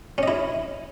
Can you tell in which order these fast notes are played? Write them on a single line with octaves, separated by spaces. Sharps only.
C#4 D#5 E4